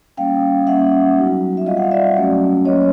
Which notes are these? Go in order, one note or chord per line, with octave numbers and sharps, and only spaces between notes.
G3 A#3 C#4 F5 G5
G3 A#3 C#4 E5 F#5
F#3 B3 D#4 F#4
E5
G3 C4 F4 D#5 F5
F#5
F5
D5 E5
F#3 A3 C#4 F#4
F#3 A#3 C#4 C#5 D#5